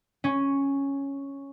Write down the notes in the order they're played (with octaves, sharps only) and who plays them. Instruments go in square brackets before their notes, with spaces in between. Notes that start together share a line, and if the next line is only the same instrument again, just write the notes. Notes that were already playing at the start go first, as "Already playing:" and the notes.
[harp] C#4